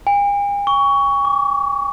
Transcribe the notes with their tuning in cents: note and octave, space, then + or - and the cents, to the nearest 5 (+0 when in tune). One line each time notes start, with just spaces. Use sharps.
G#5 -45
C#6 +20
D6 -30